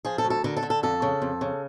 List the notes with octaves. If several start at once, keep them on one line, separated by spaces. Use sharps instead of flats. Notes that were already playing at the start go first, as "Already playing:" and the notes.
F3 G#4
A4
D2
A4
D3 A#4
A4
D3
A4
F2 A4
C#3
F2
C#3